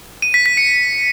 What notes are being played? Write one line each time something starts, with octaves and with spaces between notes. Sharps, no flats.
D#7
B6
B6
C#7